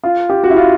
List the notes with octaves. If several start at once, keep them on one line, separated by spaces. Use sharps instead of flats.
F4
G4
F#4
E4
F4